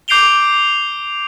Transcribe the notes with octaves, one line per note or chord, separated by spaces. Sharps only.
D6 G6 C7 D7 F7 G7